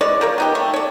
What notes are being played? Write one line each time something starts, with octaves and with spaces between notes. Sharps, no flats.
E3 G#3 C#5 D5
F3 A#4 C#5
B3 D#4 G4
A3
C#5 D5